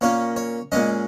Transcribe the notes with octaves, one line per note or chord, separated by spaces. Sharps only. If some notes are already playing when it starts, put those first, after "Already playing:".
A#2 A#3 C#4 C#5
C#5
A#2 G#3 C#4 D#5